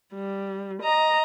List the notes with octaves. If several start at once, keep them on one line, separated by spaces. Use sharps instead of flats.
G3
D#5 A#5